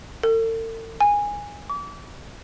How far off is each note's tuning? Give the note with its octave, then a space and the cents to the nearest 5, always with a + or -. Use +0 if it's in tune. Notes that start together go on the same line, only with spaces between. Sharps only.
A4 +45
G#5 -15
D6 -35